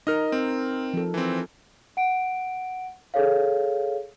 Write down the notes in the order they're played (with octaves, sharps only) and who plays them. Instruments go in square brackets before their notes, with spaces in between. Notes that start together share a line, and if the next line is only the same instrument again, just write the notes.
[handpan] D#4 A#4 [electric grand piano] D#5 F6
[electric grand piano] C4
[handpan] F3 A4
[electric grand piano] E3 C4
[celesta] F#5 D7
G#4 A4 C#5 F5